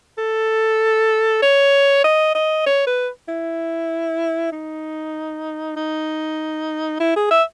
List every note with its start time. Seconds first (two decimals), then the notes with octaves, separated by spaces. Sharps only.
0.18 A4
1.42 C#5
2.04 D#5
2.35 D#5
2.66 C#5
2.87 B4
3.28 E4
4.52 D#4
5.76 D#4
7.00 E4
7.16 G#4
7.31 E5